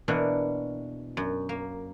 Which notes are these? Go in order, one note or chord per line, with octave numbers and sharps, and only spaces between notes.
B2 E3 A#3 B3 D4 A#4
F#2
A#3